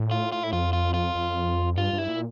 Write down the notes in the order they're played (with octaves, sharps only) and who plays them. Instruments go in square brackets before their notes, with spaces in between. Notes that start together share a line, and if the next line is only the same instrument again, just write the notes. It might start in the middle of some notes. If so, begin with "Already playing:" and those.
Already playing: [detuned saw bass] A2
[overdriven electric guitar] F4
F4
E4
[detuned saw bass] F2 [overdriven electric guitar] F4
[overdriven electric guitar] F4
F4
[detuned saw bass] F2
[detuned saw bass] G2 [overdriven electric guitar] F4
[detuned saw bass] G2
[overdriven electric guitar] E4
[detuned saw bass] A#2